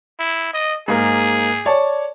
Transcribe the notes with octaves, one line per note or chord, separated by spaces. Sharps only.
E4
D#5
G#2 A#3 G#4
C#5 D5 A5